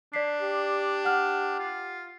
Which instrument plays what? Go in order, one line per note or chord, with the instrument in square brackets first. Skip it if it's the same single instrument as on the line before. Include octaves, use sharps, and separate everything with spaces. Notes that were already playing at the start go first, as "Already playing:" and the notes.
[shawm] D4 [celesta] D5 B6 C7
[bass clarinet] G4
[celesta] F#5 F6
[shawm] F4